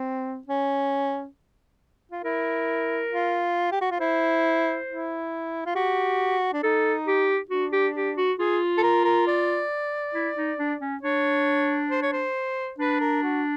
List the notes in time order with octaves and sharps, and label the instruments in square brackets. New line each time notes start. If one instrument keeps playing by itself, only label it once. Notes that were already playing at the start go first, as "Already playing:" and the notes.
Already playing: [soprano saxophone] C4
C#4
F4
[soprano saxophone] E4 [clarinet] A#4
[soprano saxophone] F4
G4
F#4
F4
[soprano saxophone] E4 [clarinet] C5
[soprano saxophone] E4
F4
[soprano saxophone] F#4 [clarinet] G4
[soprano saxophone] D4
[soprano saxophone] D#4 [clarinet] A4
[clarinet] G4
[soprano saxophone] D4 [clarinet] F#4
[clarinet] G4
G4
F#4
[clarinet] F4 [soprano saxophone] G#4
[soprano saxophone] A4
A#4
A#4
D5
[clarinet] E4
D#4
D4
C#4
[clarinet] D4 [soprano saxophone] C#5
[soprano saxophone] C5
C#5
C5
[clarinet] D4 [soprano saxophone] B4
[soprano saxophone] A#4
F#4